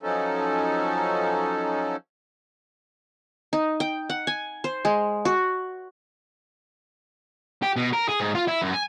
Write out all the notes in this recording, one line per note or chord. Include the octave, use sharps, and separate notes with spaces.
F3 F#3 C#4 D#4 A4
D#4
G5
F#5
G#5
C5
G#3
F#4
G4
B2
A#4
G#4
G#2
F4
E4
F#2
G#5